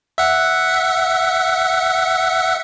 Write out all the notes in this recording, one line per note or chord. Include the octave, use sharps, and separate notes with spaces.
E5 F#5